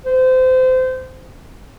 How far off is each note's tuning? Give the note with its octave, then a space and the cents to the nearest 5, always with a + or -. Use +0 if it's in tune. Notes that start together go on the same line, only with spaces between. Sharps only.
C5 -25